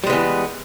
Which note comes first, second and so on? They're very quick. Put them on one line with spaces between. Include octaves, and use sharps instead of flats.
G3 G#3 B3 E3